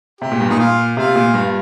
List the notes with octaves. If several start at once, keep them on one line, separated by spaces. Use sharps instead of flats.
C3 G4
A#2
G2
A#2 D#4
F4
C3 F4
A#2
G2